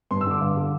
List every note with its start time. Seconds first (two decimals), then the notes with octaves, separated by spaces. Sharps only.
0.11 G2 C6
0.21 E6
0.26 D3 D6
0.41 G2 F5
0.57 D3